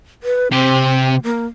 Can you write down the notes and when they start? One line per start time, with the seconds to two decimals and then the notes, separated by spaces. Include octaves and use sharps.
0.23 B4
0.52 C3 C4 G4
1.23 A#3